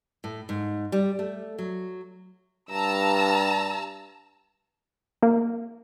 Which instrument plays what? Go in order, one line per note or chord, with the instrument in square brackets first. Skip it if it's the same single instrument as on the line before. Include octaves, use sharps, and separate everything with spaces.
[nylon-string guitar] A2
G#2
G3
A3
F#3
[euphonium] G2 [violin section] A5 A#5 E6
[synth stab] A#3